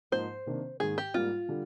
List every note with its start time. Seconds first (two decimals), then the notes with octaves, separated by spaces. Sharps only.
0.12 G#2 F3 A#3 D#4 C5
0.46 C3 D#3 A#3 D4
0.80 G#2 D#3 A#3 G#4
0.98 G4
1.14 G#2 G3 A#3 F4
1.49 D3 G3